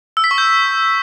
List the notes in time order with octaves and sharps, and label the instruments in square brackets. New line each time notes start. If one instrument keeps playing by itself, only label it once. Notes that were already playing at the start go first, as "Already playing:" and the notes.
[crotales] E6
B6
C#6
G6